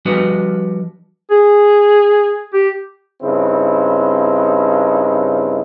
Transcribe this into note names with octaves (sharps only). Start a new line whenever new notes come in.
F3 G3 D4 F#4 B4 D#5
G#4
G4
G2 C#3 C4 D#4 E4